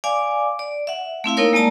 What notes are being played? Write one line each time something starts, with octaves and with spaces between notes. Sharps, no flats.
D5 F5 G#5 D6
D5
E5 F#5
A3 C4 E4 F5
A#3 D#4 E4 A#4 C#5 F5
G#3 A#3 D5 A5 A#5